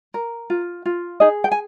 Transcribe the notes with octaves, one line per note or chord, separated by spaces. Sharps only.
A#4
F4
F4
D#4 G#4 D#5
G5
G#5